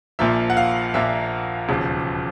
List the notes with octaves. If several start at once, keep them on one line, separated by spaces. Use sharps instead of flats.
A#1 A#2 F3 A#3 E5
F#5
F5
A#1 A#2 F3 A#3 E5
E1 D#2 C#3 F3